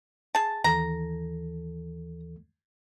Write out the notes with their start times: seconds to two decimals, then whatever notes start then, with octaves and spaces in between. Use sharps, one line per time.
0.35 G#4 A5
0.64 D#2 E3 A4 A#5